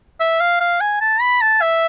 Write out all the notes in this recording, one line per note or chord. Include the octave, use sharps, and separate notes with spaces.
E5
F5
F5
G#5
A5
B5
A5
E5